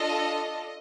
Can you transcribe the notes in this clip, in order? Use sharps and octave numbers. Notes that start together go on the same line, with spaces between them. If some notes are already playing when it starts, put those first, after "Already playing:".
Already playing: D4 F4 A4 D#5